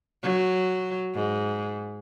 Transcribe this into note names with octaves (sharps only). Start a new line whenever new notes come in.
F#3
G#2